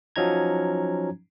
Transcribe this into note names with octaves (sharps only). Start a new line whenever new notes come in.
F3 F#3 C#4 D#4 A#5 G#6